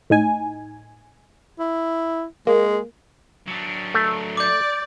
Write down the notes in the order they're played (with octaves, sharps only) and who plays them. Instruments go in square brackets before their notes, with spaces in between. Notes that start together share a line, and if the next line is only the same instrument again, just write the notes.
[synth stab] A2 D#4 G#5
[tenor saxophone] E4
[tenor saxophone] G#3 [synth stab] A#3
[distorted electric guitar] F#3 D4
[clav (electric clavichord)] A3
[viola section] D5 [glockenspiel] D6 G6